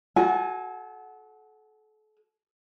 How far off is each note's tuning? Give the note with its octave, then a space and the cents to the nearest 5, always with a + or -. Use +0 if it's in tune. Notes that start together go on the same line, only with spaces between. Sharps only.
F#4 +0 A4 -35 G#5 +0